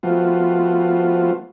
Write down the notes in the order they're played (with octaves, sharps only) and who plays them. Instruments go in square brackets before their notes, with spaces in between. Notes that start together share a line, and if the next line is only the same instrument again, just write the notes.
[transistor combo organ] F3 A3 B3 C4 F4 F#4